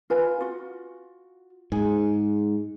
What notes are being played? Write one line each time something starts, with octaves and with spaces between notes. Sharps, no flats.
F4 B4 G#5
F4 F#4
G#2 G#4